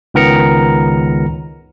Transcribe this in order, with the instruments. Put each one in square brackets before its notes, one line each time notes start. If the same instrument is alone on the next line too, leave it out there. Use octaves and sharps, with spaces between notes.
[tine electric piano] C#2 D#3 B3 A#4 A#5 C#7